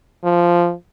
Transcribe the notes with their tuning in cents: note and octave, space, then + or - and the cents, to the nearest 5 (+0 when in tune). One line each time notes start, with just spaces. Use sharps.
F3 -10